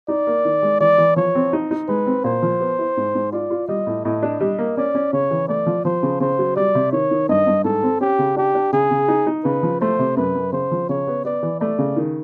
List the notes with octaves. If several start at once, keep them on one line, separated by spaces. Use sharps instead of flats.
D#4 D5
A#3
D#3
G#3
E3 D5
E3
F3 C#5
C4
D#4
D#4
G#3 B4
C4
A#2 C5
F3
B3
E4
G#2
G#2
F4 D5
F4
G3 D#5
A2
A2 D#5
D4
G3 D#5
A#3
C#4 D5
C#4
C#3 C#5
E3
A3 D5
F3
F3 C5
C#3
C#3 C5
F#3
G3 D5
C3
D#3 C#5
D#3
G2 D#5
G2
G#2 A4
C4
C#4 G4
C#3
D4 G4
D4
C#3 G#4
C#3
D#4
D#4
C#3 B4
F3
A3 C5
C3
F#2 B4
F#2
C#3 C5
F3
C#3 C#5
B3
B3 D5
E3
A3 D5
C#3
D#3